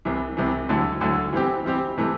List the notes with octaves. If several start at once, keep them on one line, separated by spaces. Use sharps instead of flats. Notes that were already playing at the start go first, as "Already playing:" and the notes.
C2 C3 E3
C2 C3 E3
D2 D3 F#3 A3 E4
D2 D3 F#3 A3 E4
E3 G3 C4 G4
E3 G3 C4 G4
C3 E3 A3